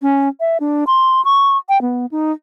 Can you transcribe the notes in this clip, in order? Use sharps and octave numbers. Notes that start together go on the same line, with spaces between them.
C#4
E5
D4
C6
C#6
G5
B3
D#4